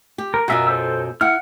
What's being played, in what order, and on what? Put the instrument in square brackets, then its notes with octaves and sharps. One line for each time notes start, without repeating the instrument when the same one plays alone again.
[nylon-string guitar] G4
[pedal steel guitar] A#4
[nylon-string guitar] F#2 B2 F4 [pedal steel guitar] F#4 A#4 E5
[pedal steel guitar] A4 C5 E6
[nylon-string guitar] E4 [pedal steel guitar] F#5 F6